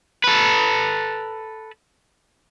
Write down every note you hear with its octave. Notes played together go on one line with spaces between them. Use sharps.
A4 B4